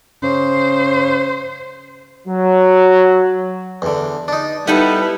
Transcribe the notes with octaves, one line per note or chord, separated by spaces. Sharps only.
C#3 C5
F#3
E2 D3
D4 D#4
G3 B3 D#4 E4 A4 B4 F#5